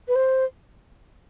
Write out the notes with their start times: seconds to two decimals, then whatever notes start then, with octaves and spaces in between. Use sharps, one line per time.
0.08 B4
0.15 C5